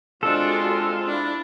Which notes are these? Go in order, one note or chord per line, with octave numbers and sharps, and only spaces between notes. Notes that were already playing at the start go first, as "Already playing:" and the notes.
G#3 C4 D4 F4 F#4 A4
D4 E4